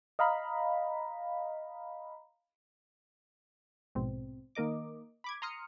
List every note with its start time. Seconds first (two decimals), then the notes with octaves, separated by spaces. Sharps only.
0.19 D#5 F5 A#5 B5
3.95 A#1 G#2 B2 C4
4.55 D#3 A#3 A#4 D#5 D6
5.24 B5 D6 G#6
5.42 A#5 C6 D#6 F6 C#7